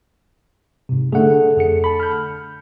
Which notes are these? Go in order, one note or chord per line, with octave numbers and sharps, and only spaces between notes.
G#2 C3
D3 A3 G#4 F#5
F2 G#4 C#7
A5 B5
F6 G6